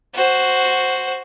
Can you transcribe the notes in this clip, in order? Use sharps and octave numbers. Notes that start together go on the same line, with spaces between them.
F#4 C5